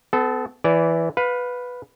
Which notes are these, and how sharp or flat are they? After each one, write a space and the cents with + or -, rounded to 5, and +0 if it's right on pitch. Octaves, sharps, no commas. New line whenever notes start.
B3 +35 A4 -15
E3 +0 D5 -20
B4 +0 F5 +30